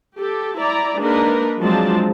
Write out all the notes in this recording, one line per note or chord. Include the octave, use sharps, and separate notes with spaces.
G4 A4
E4 D5 A#5
G#3 A#3 D4 D#4 A#4 B4
F3 F#3 G#3 C4 D4 A5